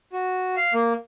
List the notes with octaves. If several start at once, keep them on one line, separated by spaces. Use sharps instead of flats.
F#4
F5
A#3